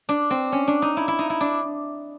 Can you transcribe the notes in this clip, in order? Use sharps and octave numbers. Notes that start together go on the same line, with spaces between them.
D4
C4
C#4
D4
D#4
E4
E4
D#4
E4
D4